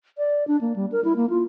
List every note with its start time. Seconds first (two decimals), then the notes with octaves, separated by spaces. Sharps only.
0.18 D5
0.48 D4
0.61 A#3
0.76 G3
0.92 A#4
1.05 E4
1.16 A#3
1.30 F4